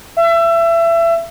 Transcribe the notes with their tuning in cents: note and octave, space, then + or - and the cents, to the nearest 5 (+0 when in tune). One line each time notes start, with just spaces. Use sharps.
E5 +30